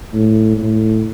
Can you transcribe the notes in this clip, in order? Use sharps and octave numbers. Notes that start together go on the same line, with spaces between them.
A2
A2